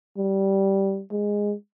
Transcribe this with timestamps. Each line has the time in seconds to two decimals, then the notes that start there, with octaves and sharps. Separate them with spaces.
0.18 G3
1.12 G#3